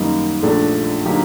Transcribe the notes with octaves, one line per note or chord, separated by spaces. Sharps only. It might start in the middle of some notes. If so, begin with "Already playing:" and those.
Already playing: F#2 D#3 G3 A#3 D#4
A#1 A#2 A3 D4
D3 F#3 A#3 D#4 G4